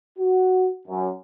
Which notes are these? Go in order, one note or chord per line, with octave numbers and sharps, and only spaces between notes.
F#4
F#2